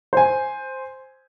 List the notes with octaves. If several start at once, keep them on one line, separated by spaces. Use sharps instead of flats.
C5 G#5